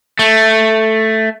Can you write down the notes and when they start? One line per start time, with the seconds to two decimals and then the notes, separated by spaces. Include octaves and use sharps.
0.19 A3